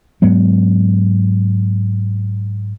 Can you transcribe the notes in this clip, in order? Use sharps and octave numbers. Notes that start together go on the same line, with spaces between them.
G#2 F#3 G#3 B3